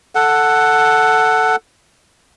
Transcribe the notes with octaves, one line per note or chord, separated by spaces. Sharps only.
A4 F#5